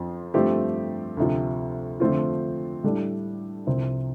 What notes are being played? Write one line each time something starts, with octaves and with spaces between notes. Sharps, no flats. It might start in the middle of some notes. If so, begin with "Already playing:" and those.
Already playing: F2 F3 C4
G2 F3 A3 C4 G4
D2 C3 F3
D3 F3 A3 C4 F4
A2 G3 D4 A4
C2 C3 F3 C4